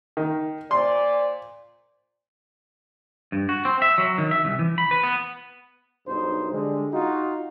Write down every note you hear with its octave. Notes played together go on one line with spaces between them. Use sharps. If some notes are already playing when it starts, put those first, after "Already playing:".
D#3
A#2 C5 D5 C6
G2
F#4
C4
E5
F#3
D#3
E5
C2
E3
B5
B4
B3
B1 G2 D#4 C5
D3 G3 G#3
D#4 F4 F#4